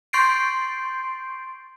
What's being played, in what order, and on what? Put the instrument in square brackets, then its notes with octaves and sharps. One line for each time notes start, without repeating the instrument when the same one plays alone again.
[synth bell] C6 C#6 G6 A6 C7 D7